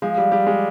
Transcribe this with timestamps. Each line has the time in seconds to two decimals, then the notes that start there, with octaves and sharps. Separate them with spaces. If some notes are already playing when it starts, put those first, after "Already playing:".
0.02 F3 G#3
0.18 G3
0.31 G3 G4
0.47 G#3